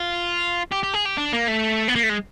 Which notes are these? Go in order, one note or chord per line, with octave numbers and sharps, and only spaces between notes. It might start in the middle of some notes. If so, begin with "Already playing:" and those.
Already playing: F4
G4
G4
G#4
G4
D4
A#3
A3
B3
A#3
A3
G#3